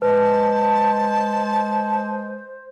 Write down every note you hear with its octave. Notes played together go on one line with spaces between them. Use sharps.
G#3 B4 C5 A5